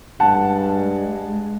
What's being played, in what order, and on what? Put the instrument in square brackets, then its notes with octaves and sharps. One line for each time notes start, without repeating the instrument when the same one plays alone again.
[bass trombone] G2 [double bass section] G#3 [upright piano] F#5 A5